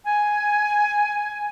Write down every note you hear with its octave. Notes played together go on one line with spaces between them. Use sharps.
G#5